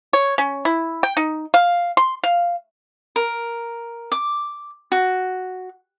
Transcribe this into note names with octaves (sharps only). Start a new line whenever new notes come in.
C#5
C#4
E4
G5
D#4
F5
C6
F5
A#4
D6
F#4